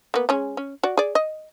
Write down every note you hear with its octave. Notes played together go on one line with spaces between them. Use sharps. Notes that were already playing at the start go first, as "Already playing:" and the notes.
A#3 B3
G#3 C#4 G#4
C#4
F#4 D5
G#4 D5
D#5